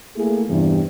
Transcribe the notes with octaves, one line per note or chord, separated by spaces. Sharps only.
A3 A#3 E4 G#4
E2 G2 C3 E3